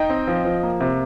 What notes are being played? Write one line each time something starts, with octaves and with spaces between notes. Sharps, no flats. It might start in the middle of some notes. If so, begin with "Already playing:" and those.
Already playing: D#4 D#5 G5
C4
F3
F3
A#3
C3